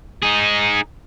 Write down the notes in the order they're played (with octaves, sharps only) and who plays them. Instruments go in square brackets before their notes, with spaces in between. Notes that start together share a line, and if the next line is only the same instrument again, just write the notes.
[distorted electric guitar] D#4 G#4